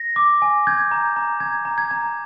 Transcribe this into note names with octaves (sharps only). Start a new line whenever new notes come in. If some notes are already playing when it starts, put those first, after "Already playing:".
Already playing: A#6
D6
G#5
G6 G#6
A#5
A#5
A#5 G#6
A#5
G#6
A#5